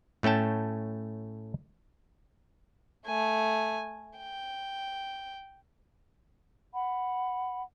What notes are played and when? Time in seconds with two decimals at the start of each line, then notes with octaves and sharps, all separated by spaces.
0.23 A2 A3 C#4 G5 A5
3.06 A3 G#5
4.18 G5
6.73 F#5 B5